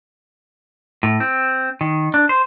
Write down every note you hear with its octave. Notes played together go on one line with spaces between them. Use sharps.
A2
C4
D#3
D4
C5